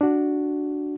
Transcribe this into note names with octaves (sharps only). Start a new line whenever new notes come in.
D4 F#4